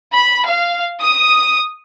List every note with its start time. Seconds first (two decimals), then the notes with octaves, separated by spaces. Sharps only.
0.12 B5
0.47 F5
1.00 D#6